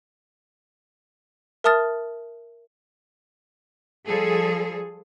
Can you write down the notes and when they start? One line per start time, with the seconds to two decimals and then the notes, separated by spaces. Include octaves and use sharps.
1.64 A#4 E5 A5 D#6 F6 A6
4.05 F3 G3 G#4 A4